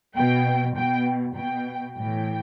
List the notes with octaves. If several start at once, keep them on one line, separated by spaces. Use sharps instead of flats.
B2 G5
B2 G5
B2 G5
A2 E3 G5